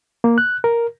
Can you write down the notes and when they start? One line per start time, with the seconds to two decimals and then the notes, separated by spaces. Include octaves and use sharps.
0.24 A#3
0.38 F#6
0.64 A#4